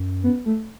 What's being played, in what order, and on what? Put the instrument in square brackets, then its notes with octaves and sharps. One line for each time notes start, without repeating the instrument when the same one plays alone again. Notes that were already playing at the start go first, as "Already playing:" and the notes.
Already playing: [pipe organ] F#2
[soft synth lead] B3
A3